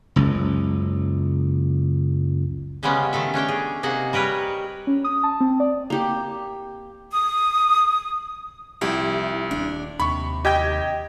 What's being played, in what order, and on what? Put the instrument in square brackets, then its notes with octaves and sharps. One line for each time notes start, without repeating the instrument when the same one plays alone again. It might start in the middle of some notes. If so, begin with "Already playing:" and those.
[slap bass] F#1 C#2
[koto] C#3 G3 G#3 B3 C#4
D#3 A3 A4 E5
C#4 D4 C#5 G5
G#4
C3 A#3 D#4 G#4 F#5
G3 A#4 B4 C#5 D#5
[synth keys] C#4
D#6
A5
C4
D5
[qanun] A#3 G4
[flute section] D#6
[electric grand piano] C2 [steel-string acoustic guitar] F3 E4 G4
[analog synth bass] D#1 [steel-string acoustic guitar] D4
[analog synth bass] D#2 [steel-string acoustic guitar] C3 [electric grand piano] B5 C#6
[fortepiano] G4 G5 [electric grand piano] D#5 G#6